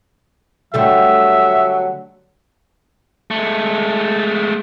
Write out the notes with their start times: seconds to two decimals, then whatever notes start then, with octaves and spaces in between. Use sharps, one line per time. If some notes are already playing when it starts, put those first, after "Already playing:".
0.74 D3 F#3 G3 A3 E5
3.31 G#3 A3